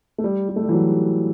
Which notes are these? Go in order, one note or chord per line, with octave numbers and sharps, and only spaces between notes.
A3
G3
G3
A3
G3
E3
F#3